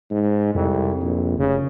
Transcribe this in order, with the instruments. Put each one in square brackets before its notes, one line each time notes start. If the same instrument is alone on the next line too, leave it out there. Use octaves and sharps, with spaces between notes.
[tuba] G#2
[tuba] C2 [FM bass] F2
[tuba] A#1
[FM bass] F1 [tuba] C#3